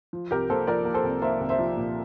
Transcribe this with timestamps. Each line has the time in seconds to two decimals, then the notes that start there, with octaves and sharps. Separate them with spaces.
0.13 F3
0.31 C2 G4 A#4
0.50 A#3 A4 C5
0.67 F3 A#4 D5
0.85 A#3
0.94 A4 C5
1.04 C2
1.22 A#3 C5 E5
1.40 C2
1.49 C5 E5
1.59 F3
1.77 A#2